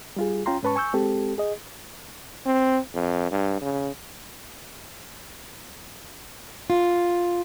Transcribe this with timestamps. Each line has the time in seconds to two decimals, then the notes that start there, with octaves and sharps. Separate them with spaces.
0.16 G3 F4 G#4
0.46 C#4 F4 G5 A#5 C6
0.63 G#2 C#4 B4 A5 C#6
0.76 G#5 C#6 E6 G6
0.93 G#3 C4 G4 A4
1.38 G#4 D#5
2.46 C4
2.94 F2
3.31 G2
3.61 C#3
6.70 F4